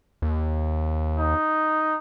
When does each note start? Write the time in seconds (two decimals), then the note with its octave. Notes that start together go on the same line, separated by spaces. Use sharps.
0.22 D#2
1.18 D#4